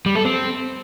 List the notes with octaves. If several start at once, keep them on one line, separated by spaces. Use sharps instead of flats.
G3
A4
C4